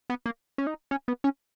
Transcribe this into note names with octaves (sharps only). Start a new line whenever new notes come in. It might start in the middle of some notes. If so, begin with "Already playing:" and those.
B3
A#3
C#4
D#4
C#4
B3
C#4